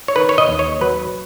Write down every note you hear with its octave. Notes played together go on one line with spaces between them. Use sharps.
C#5
D#3 B4
C#5
D#5
D#2
C#5
F#3 B4